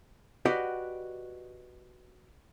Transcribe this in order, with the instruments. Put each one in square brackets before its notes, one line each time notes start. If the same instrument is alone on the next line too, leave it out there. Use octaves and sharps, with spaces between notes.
[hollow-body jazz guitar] F#4 G4 B4 D5 D#5 F#5